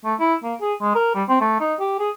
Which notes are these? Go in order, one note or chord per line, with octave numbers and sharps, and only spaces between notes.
A3
E4
A#3
G#4
G#3
A#4
G3
C4
A3
D#4
G4
G#4